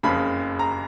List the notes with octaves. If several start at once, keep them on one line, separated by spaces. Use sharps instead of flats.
F#1 F2 C#3 B5
A#5